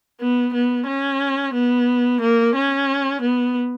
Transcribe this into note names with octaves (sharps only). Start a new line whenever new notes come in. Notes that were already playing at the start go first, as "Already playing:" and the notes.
B3
B3
C#4
B3
A#3
C#4
B3